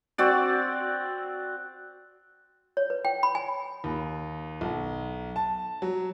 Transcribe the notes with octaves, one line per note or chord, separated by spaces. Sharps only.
C4 F#4 D5
C#5
B4
G5
B5
G#5
D#2
B1
A5
F#3